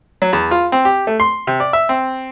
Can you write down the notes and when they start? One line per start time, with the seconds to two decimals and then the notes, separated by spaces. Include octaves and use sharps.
0.22 F#3
0.33 E2
0.51 F4
0.72 C4
0.85 G4
1.07 A3
1.20 C6
1.47 C3
1.60 D5
1.73 E5
1.89 C4